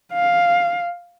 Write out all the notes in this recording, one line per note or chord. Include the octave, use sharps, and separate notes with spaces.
F5